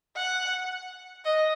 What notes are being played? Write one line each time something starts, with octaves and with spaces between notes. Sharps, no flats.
F#5
D#5